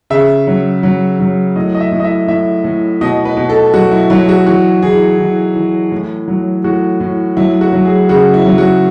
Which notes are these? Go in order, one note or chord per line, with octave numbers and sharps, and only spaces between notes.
C#3 E5
F#3
F#3
F#3
A2 D#5
D#5
E5
A2
D#5
E5
A2 E5
A2
B2 D#5
B4
B2
A4
F#3 F#4
E4
F#3 E4
F#4
E3 F#4
E3 G#4
E3
E3
A2
F#3
A2 F#4
A2
F#3 E4
F#4
F#3
G#4
C#3 F#4
E4
F#3
F#4